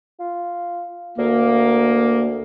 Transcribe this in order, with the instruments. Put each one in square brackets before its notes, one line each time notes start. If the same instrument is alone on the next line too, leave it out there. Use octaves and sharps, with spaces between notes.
[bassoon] F4
[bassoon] D2 [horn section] A#3